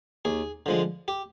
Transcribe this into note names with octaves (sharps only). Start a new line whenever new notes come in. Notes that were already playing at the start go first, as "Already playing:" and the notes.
D#2 G#4
D3 F3 G#3
G4